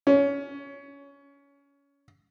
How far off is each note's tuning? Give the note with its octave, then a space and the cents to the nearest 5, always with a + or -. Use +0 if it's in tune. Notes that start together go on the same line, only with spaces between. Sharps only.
C#4 +20